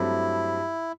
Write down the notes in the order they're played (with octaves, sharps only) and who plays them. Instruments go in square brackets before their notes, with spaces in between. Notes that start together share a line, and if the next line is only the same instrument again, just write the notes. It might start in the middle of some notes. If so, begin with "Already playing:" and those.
Already playing: [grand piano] G2 F#3 A3 C4 [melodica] E4